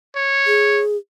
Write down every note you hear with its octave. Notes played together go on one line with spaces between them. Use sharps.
C#5
G#4